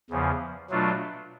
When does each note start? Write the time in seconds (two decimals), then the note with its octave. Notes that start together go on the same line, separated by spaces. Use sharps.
0.10 E2 C#3 F3
0.70 B2 F#3 A3 D4 F4